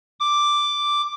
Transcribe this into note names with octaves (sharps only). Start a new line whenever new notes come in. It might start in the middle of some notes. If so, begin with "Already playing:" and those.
D6